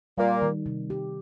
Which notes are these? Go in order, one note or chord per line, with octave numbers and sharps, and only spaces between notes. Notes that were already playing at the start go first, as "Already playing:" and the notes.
A#2 G3 A#3
D#3
C3
G4